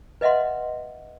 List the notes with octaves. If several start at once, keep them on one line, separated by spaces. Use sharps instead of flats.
B4 D#5 E5 F#5 C6